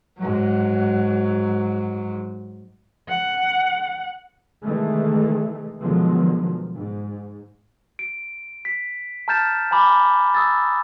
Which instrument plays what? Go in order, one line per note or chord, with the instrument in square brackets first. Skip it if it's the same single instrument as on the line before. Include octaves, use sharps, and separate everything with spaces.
[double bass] G#2 F#3
[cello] F#5
[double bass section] C3 D#3 E3 G#3 A3
B2 D3 D#3 F3 F#3 G#3
G#2
[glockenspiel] D7
B6
A5 A#5 F6 G6 A6 E7
G#5 A#5 B5 D6
D#6 E6 A6